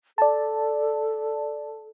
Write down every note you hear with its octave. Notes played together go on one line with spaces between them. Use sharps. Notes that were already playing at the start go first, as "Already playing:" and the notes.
A4 D5 A5